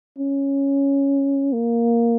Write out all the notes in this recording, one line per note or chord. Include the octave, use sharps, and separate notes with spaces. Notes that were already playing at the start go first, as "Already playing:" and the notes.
C#4
A#3